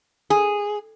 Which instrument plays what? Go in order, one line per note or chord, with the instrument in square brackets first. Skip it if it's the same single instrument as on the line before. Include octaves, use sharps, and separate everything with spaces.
[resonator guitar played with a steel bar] G#4